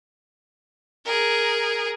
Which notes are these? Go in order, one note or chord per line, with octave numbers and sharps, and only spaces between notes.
G#4 A#4